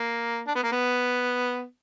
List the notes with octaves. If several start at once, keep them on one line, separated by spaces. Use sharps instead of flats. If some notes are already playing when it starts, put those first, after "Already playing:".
Already playing: A#3
D4
B3
A#3
B3